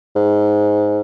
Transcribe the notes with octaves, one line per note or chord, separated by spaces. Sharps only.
G#2